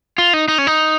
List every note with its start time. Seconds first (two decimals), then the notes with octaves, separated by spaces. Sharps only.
0.18 F4
0.34 D#4
0.48 D#4
0.58 C#4
0.67 D#4